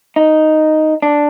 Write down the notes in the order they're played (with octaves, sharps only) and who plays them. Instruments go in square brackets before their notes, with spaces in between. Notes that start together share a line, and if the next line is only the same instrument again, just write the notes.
[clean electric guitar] D#4
D4